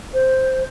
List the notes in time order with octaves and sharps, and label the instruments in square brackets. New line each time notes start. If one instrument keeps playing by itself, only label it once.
[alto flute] C5